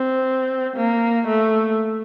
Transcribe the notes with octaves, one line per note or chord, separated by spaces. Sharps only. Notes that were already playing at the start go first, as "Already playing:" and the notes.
Already playing: C4
A#3
A3